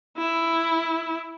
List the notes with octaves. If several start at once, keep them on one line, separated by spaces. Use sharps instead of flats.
E4